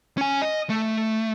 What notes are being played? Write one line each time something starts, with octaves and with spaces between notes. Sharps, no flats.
C#4 G#5
D#5
A3